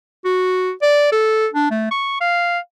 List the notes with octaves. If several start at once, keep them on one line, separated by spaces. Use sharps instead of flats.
F#4
D5
A4
D4
A3
C#6
F5